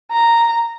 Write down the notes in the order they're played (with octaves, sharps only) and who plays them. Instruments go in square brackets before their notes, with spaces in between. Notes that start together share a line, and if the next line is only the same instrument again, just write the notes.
[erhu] A#5